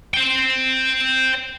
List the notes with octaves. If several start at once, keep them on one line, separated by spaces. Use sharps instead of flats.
C5 G5